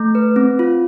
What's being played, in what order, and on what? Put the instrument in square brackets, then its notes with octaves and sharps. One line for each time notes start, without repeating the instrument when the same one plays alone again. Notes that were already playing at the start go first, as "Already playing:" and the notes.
Already playing: [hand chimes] A3
B4
C4
F4